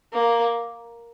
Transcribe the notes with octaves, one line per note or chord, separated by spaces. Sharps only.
A#3